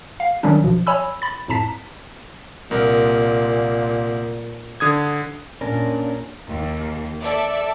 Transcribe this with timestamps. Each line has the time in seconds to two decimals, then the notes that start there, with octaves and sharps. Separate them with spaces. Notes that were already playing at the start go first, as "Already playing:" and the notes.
0.20 F5
0.43 D#3 F#3 G3 C#4 D4
0.64 A#1 B2 F3
0.87 C#5 G#5 B5 E6
1.22 B5 A6
1.48 F2 A2 A5 A#5 B6
2.71 C2 A#2 A#4
4.80 D3 D#6 G#6
5.61 A#2 C#4 D4 A#4
6.47 D#2
7.23 A4 D5 E5